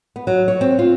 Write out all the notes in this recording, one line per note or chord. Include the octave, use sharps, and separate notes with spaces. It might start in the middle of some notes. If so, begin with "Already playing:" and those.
B3
F#3
C#5
C4
F4